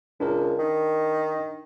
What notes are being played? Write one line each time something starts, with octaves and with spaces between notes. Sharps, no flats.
C#2 D4 A#4
D#3